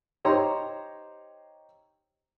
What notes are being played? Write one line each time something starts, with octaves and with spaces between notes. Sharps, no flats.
D#4 G4 C5 C#5 A#5 C6